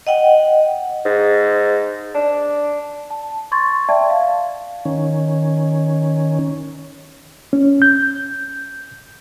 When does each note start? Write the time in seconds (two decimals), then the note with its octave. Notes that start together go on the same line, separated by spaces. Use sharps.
0.07 D#5 F#5 G5
1.05 G#2
2.14 D4
3.11 A5
3.52 C6 C#6 G#6 A6
3.89 D5 E5 G5 A5 G#6
4.10 F5
4.85 D#3 C#4
7.53 C#4
7.82 G6